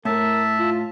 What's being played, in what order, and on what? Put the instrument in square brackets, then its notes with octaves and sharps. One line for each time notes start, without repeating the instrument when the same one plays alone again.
[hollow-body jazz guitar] A2 [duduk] A#4 [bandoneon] E5 A5
[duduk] F4